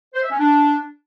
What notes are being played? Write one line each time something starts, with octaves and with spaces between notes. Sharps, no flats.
C5
E5
C#4
D4